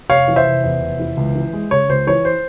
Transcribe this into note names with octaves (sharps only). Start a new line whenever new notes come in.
F1 C#5 F5
E3
C5 E5
F1
E2
F1
E3
C#2
E3
G#3
C#3 C#5
C#2 C5
E3 C#5
C5